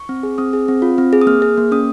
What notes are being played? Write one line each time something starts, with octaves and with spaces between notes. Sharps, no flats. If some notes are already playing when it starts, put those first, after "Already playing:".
Already playing: C#6
C4
G#4
C4 D#6
G#4
C4
F4
C4
G#4
D#6
A#3 F6
G#4
A#3
C#4 D#6